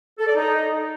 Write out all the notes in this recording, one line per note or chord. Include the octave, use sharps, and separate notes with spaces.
A4
D5
D#4